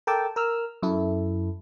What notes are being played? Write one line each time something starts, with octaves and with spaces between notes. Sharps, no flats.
A4 A#4 G5 A5 D6 E6
A#4 E6 F6
F#2 E4 A4